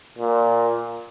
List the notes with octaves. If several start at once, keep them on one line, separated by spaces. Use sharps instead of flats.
A#2